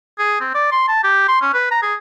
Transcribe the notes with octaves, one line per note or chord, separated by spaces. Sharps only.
G#4
C4
D5
C6
A5
G4
C6
C#4
B4
A#5
G#4